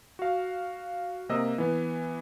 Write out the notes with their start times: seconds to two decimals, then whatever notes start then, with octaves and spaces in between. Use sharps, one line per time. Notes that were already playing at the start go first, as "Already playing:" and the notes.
0.19 F#4 F5
1.29 C3 A#3 D#5 E6
1.58 E3 B3